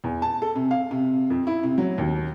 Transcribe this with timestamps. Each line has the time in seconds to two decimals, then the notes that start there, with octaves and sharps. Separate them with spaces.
0.04 E2
0.22 A5
0.42 A4
0.56 C3
0.71 F5
0.91 C3
1.30 F2
1.47 E4
1.63 C3
1.78 F#3
1.98 D#2